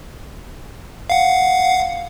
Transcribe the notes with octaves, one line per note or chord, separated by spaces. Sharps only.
F5 F#5